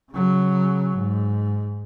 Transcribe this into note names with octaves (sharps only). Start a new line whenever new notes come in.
C#3 F#3
G#2